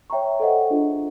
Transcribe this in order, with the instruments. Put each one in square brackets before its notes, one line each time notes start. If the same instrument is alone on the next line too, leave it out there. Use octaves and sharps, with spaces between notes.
[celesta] C#5 E5 G5 A#5 C#6
A4 C5 D#5 F#5
D4 F4 G#4